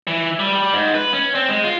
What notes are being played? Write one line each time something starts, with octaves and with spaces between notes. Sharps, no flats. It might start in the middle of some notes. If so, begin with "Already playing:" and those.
E3
G3
G3
G#2
B4
C#4
C4
G#3
F4